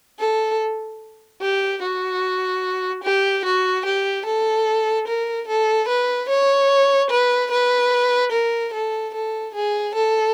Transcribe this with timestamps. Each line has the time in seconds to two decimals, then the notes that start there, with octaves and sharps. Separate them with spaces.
0.19 A4
1.42 G4
1.83 F#4
3.04 G4
3.45 F#4
3.86 G4
4.26 A4
5.08 A#4
5.48 A4
5.88 B4
6.29 C#5
7.11 B4
7.51 B4
8.32 A#4
8.73 A4
9.14 A4
9.54 G#4
9.95 A4